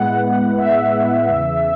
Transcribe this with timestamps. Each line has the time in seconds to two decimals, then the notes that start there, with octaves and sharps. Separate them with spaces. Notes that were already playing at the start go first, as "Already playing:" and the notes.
Already playing: A2 G#3 B3 E4 F#5
0.23 F#5
0.57 E5
1.29 E2 C#3 E3